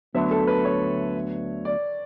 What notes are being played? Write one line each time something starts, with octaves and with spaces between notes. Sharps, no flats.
D2 D3 F#3 B3 E5
A4
B4
C#5
D5